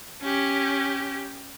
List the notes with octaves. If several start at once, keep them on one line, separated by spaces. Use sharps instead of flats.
C#4 G4